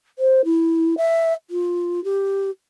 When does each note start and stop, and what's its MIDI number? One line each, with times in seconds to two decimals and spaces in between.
0.19 0.45 72
0.45 0.95 64
0.98 1.34 76
1.50 2.03 65
2.04 2.50 67